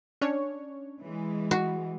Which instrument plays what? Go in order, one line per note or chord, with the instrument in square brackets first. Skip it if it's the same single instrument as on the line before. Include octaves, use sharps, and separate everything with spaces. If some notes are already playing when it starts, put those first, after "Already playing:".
[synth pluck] C#4 D4 C#5
[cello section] E3 G#3
[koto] F#4